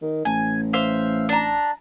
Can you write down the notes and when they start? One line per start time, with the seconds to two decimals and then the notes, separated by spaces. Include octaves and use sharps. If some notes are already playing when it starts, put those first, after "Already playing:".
0.02 D#3
0.25 A1 G#5
0.73 C5 E5 F5
1.29 D4 A#5